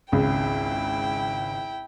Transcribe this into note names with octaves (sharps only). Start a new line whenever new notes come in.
G#1 C#2 C#3 E4 G5